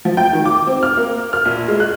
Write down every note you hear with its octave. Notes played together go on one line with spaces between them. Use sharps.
F3
G5
D#3
D6
C4
F6
A#3
F6
A#1
G#3
F#6